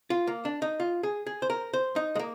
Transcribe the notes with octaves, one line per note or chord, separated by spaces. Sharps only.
F4
A#3
D4
D#4
F4
G#4
G#4
C5
A#4
C5
D#4
G#3
A#3